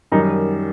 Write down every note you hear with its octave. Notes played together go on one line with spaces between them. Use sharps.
F#2 D#3 G3 D#4